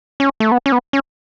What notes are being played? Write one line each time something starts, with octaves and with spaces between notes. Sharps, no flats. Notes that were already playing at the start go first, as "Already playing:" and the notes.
C#4
A3
B3
C#4
B3
C#4